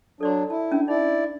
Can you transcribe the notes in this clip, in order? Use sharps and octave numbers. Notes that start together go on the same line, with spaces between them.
F#3 D4 A4 D5 C6
E4 A5
C#4 D4
D#4 E4 D5